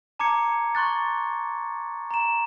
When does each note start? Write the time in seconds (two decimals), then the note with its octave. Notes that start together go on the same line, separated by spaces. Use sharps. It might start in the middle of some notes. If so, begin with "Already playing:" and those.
0.19 A5 A#5 D6 G#6 C#7
0.75 C6 C#6 F#6 A6
2.11 A#5 E7